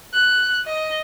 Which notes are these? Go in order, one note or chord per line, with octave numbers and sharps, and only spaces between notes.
F#6
D#5